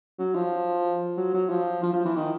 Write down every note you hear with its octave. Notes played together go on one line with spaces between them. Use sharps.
F#3
F3
F#3
F#3
F3
F3
F3
E3
D#3